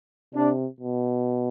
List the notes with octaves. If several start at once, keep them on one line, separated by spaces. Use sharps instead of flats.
C3 D4
B2